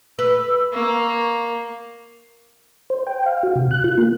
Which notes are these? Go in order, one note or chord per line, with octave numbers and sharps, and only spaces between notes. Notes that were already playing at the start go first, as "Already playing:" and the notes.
B4 E6
A#3 C#6
C5
G5
F5
F#4
C3
F#6
F4
A#3